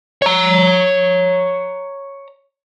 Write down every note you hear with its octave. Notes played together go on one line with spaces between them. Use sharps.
C#5 A#5